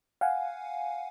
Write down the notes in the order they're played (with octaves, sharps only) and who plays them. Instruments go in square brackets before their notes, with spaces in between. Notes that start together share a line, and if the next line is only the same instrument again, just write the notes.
[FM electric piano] F5 F#5 G#5